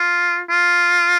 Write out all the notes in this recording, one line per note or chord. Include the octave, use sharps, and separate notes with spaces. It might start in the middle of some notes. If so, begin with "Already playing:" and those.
Already playing: F4
F4